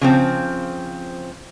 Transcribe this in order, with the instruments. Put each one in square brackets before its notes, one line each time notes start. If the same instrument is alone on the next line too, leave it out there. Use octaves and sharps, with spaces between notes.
[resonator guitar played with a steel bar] C#3 F3 C4